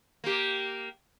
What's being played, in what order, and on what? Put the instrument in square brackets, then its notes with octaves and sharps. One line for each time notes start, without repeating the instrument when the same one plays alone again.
[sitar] A#3 G4